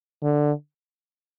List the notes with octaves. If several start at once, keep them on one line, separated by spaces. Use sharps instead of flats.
D3